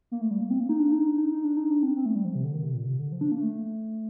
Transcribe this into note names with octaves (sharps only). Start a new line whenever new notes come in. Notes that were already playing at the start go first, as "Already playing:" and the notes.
A#3
A3
G3
A#3
C4
A#3
D#4
D4
D#4
D4
D#4
D#4
D4
D#4
D4
C4
C4
A3
G3
F3
C3
D3
D#3
C3
A#2
C3
D3
F3
D4
A#3
A3